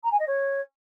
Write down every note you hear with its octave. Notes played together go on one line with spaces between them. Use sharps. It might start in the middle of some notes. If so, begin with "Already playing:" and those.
A#5
G#5
D#5
C#5